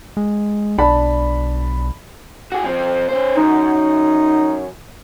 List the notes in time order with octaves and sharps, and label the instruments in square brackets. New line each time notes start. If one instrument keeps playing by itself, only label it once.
[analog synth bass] G#3
[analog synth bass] B1 [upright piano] D4 A5 B5
[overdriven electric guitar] F#4 G#4
F3 C4
C#4 C5
[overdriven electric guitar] F#2 [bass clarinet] D#4